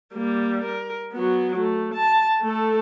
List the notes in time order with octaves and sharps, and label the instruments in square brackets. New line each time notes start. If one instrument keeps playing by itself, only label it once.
[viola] G3 A#3
A#4
F#3 B3
A3
A5
A3 A4